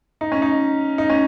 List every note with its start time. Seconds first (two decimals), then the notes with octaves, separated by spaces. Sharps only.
0.21 D#4
0.32 C#4
0.42 D#4
0.98 D#4
1.10 C#4